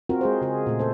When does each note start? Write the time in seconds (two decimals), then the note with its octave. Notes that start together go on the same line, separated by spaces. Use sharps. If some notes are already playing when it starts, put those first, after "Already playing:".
0.09 C4 F4 F#4 A#4
0.21 G#3 G#4 C5
0.41 C#3 G#4
0.66 A#2 A3
0.79 A4 C5